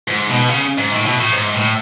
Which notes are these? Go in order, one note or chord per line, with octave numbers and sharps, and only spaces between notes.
G#2
B2
C#3
G#2
A2
B2
A2
G#2
A2